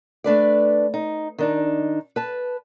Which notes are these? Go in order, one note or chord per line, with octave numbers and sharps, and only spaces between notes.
A3 D4 B4 D5
D#4
D#3 D4 D#4
B4 A5